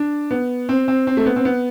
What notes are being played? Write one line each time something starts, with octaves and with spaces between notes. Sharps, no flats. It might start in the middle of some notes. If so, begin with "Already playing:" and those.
Already playing: D4
B3
C4
C4
C4
A3
B3
C4
B3